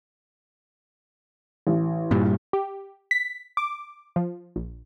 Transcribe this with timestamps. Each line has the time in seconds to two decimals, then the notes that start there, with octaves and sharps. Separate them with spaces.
1.67 A1
2.11 G2 A#2 G3
2.53 G4
3.11 B6
3.57 D6
4.16 F3
4.56 A#1